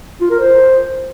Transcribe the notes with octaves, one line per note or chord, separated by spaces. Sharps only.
F4
A#4
C5